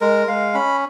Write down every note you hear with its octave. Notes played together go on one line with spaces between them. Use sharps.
G#3 A#4
G#3 F5
C#4 B5